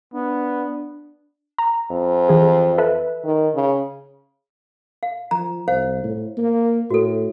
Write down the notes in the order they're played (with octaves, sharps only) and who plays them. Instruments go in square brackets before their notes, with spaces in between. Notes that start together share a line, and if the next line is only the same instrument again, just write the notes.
[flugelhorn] B3 [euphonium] D4
[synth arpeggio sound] A#5
[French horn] F2
[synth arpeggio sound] E3 G#4
A4 B4 E5
[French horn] D#3
C#3
[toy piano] F5
[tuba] F3 [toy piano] A#5
[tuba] C2 [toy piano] C5 F5
[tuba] A2
A#3
[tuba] A2 [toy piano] F#4 A4